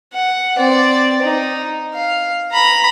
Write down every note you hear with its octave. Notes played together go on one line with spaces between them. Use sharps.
F#5
C4 D5
D#4
F5
A#5 B5